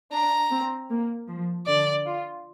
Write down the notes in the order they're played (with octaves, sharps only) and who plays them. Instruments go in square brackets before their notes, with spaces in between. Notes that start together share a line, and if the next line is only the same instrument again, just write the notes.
[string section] D4 [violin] A#5
[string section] C4
A#3
F3
[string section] D3 [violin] D5
[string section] F4